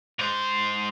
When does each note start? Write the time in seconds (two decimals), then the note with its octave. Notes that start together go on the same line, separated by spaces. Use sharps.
0.19 G#2 C5